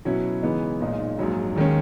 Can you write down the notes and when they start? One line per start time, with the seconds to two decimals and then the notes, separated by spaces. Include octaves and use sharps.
0.05 B2 F#3 C#4 E4
0.42 C#3 E3 G#3 B3 D#4
0.80 B1 A#2 G#3 D#4
1.19 A#1 G#2 F#3
1.56 D#2 D#3 G#3 C#4